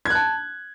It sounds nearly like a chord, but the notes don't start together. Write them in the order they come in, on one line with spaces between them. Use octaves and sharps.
G#6 F#6 A5